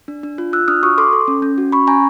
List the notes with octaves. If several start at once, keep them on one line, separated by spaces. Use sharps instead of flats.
D4
D4
F4
F4 E6 F#6
D4 D#6 F6
F#4 C#6 D#6
A4 C6 D6
A4
C#4
C#4
F#4
C#4 B5 C#6
C#4 G#5 A#5